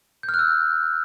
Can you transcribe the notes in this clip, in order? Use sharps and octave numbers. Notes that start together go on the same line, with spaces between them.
G6
F6
F#6
E6